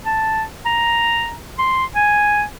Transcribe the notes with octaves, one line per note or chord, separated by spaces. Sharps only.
A5
A#5
C6
G#5